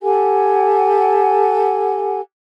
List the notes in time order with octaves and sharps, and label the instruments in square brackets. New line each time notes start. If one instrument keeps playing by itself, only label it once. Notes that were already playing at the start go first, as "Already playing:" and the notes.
[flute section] G4 A4 F#5 G#5